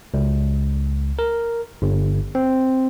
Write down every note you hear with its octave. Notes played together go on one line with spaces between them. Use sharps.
C#2
A#4
G1
C4